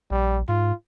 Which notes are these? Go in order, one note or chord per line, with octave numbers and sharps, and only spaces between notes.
A#1 G3
G#2 F4